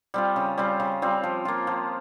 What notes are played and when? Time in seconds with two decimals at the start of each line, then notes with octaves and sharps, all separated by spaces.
0.14 G3 C4 F4
0.36 C#3
0.58 G3 C4 F4
0.80 C#3
1.02 G3 C4 F4
1.24 F3
1.45 A#3 F4
1.67 F3